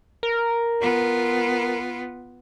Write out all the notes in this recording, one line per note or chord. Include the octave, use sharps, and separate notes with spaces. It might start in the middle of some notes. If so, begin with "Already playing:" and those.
A#4
B3 F4